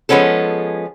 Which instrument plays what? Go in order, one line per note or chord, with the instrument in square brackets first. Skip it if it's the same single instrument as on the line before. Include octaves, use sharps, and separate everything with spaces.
[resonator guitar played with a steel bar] F3 G#3 B3 C#4 A4